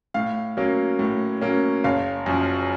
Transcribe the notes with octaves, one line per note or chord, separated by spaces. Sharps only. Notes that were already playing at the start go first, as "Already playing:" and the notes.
A2 F5
F#3 A#3 C#4
A2
F#3 A#3 C#4
F#1 F5
F#2 F3